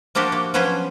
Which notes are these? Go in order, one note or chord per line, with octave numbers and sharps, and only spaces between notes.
F3 A#3 D4 F#4 G4
A#3
F3 F#3 B3 C#4 G#4 C5